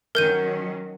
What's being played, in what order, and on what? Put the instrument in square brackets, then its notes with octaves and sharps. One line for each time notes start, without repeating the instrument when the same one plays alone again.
[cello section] D#3 F#3 C#4 [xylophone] A#4 G6 D#7